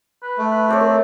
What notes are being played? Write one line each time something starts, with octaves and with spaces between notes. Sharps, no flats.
B4
A3
B4
C4 C#5 D5 A5
A#4